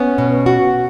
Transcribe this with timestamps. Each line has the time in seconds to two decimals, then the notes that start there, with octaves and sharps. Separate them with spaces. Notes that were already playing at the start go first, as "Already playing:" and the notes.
Already playing: B3 C#4
0.18 B2
0.46 F#4